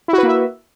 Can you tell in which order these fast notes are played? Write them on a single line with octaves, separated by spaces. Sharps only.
E4 F#4 B4 A#3 E5